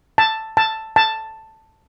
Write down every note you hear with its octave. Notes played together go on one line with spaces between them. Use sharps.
A5
A5
A5